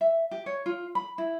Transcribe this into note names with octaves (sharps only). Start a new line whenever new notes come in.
E5
G4
C#5
F4
B5
E4